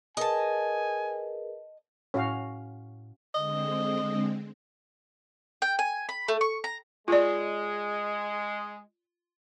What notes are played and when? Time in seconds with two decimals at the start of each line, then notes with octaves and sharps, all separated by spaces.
0.17 G#4 A#4 B4 D#5 G#5 A5
2.14 A2 C#4 F#4 F5
3.34 D3 G#3 C4 D#5
5.62 G5
5.79 G#5
6.09 B5
6.28 A3
6.41 C#6
6.64 A#5
7.08 G#3 F4 D5